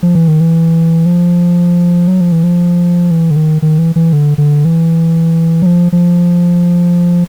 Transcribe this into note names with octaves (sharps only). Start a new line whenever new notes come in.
F3
E3
D#3
E3
F3
F#3
F3
E3
F3
E3
D3
D#3
D#3
E3
E3
D3
D3
E3
F#3
F3
F3